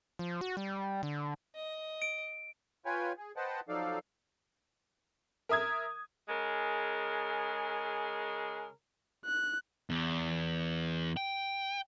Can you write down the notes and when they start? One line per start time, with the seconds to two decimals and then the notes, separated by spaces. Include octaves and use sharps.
0.19 F3
0.41 F#4
0.57 G3
1.03 D3
1.55 D#5
2.02 D7
2.85 F4 B4 C#5 G5 G#5
3.17 G#4
3.36 B4 C5 D#5 F#5 G5 A5
3.69 F3 F#3 D#4 A4 D5 F5
5.49 A#4 E5 D#6 G#6
6.28 C#3 G#3 A#4
9.25 F#6
9.90 E2
11.17 G5